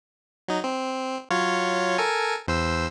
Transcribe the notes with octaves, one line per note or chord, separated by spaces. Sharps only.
F#3 D#4
C4
F#3 F4 C#5
A4 A#4 G#5
E2 C5 E6